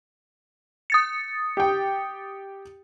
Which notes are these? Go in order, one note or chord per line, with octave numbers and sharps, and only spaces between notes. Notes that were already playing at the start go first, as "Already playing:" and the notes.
D#6 A6 C#7
G4 G5